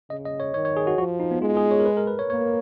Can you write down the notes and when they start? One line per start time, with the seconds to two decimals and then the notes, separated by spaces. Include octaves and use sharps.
0.10 C#3 D#5
0.25 D#5
0.40 C#5
0.54 D#3 C#5
0.65 C#5
0.77 G#4
0.87 F#4
0.98 F3 F#4
1.20 D#4
1.31 B3
1.41 G#3 F4
1.57 G#4
1.71 C#5
1.80 A#4
1.86 B4
1.97 A#4
2.07 B4
2.19 C#5
2.30 A#3 C#5